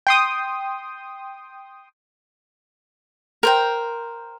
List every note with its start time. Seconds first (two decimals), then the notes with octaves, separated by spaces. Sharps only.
0.07 G5 C6 D#6
3.43 A#4 C5 G5